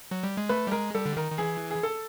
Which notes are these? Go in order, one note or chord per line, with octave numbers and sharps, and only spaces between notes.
F#3
G3
G#3
A3 B4
G3
G#3 A#4
G3 A4
D3
D#3 A#4
D#3
E3 G#4
G#4
A4